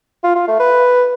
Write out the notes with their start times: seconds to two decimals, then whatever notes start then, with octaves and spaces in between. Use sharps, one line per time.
0.24 F4
0.36 F4
0.48 A3
0.60 B4